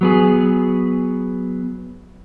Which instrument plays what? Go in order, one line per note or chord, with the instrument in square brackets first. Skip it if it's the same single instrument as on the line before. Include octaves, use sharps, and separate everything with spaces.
[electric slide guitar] F#3 B3 G#4